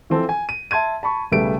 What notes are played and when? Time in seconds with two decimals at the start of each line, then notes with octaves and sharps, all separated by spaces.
0.10 E3 F3 C4 A4
0.29 G#5
0.49 D#7
0.71 E5 A5 C6 G#6 D#7
1.03 A5 B5 C#6
1.32 B1 C#3 G3 A3 B4 D7